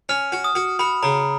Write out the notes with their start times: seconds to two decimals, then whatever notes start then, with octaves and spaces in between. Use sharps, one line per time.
0.09 C#4 F6
0.32 F#4
0.44 D#6
0.55 F#4
0.79 F#4 B5
1.03 C#3 A#5